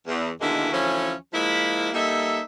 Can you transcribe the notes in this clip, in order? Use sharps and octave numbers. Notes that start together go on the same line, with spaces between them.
E2
B2 D3 D#3 G#3 A#3 E4
D2 E3 F3 C#4
F3 G#3 A#3 E4
G3 A#3 D#4 A4 E5